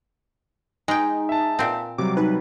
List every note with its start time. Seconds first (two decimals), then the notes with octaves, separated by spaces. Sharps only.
0.88 G#3 D#4 G5 G#5
1.29 E5 A5
1.59 A#2 C4
1.98 C3 F#3 G3 D6
2.17 D#4 B4